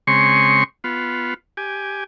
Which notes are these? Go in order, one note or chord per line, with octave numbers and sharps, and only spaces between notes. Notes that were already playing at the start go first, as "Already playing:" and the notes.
C#3 G#3 C4 C#5 C6 C#6
B3 F4
G4 G#5